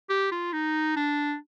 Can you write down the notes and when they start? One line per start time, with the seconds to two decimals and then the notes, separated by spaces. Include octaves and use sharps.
0.09 G4
0.31 F4
0.53 D#4
0.96 D4